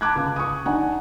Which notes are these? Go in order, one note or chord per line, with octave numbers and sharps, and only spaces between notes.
A5 B5 D6 F#6 G#6
C#2
C#6 D#6
D4 D#4 F#5 G#5